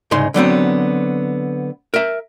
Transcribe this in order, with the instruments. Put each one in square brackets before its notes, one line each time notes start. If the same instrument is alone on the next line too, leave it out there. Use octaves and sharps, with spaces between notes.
[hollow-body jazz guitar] C2 G#2 C#3 D#4 C6
D3 F#3 B3 C4
A#4 E5